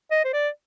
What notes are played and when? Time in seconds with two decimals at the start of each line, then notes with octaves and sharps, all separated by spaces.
0.11 D#5
0.24 C5
0.33 D5